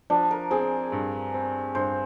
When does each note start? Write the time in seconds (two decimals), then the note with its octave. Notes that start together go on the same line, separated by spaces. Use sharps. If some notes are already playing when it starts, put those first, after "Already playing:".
0.10 F3 D4
0.31 A#4
0.51 C4 G#4
0.92 G2
1.34 C4
1.75 G2 C5